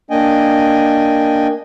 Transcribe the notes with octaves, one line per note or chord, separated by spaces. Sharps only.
A#3 D4 D#5 G5 G#5